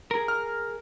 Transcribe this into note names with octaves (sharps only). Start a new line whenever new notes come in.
G#4 A#4
F6